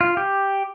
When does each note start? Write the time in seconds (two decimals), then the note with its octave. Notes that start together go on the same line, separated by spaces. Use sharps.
0.01 F4
0.17 G4